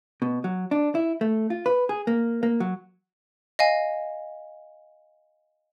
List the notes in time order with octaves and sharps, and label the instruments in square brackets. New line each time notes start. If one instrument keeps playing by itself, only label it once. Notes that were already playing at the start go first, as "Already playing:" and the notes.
[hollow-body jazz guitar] B2
F#3
D4
E4
A3
F4
B4
G#4
A#3
A#3
F#3
[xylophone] D#5 F5 G#5